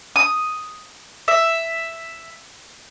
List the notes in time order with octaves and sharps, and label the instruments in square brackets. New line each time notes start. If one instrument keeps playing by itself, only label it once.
[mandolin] D#6
E5